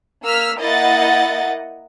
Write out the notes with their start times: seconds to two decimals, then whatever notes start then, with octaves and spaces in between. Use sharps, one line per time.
0.23 A#3 E6 F6 B6
0.59 A#3 E4 D#5 F#5 A6